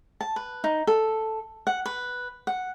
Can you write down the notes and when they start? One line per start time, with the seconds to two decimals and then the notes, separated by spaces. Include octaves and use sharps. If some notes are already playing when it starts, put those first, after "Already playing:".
0.21 A5
0.36 B4
0.64 D#4
0.87 A4
1.67 F#5
1.86 B4
2.47 F#5